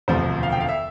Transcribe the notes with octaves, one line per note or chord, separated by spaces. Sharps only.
E1 D2 C3 F3 C5
F5
G5
F5
E5